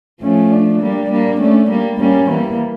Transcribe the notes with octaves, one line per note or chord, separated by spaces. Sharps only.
F3 A3 C#4
D4
G3 A#3
G3 A#3
A3 C#4
G3 A#3
G3 A#3 C#4
E3 G3 A#3